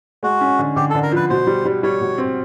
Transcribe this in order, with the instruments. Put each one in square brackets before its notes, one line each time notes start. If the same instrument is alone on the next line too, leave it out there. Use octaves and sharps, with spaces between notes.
[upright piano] G#3 [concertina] F#4
[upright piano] C#4
D3
[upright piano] D3 [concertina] G4
[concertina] A4
[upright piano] D3
[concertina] A#4
[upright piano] F3 [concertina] B4
[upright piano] B2 [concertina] C5
[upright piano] G3
G3
[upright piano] G3 [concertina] C#5
[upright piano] B2
C4